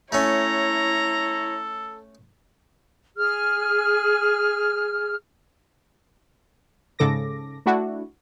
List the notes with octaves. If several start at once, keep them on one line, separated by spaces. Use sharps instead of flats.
A3 C#4 E4 A4 C#5 A#5
G#4 F6
G#2 C#3 A4 D6 A#6
A3 D4 E4 F#4